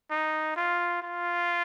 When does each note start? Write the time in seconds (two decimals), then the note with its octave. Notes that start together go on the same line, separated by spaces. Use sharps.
0.11 D#4
0.56 F4
1.02 F4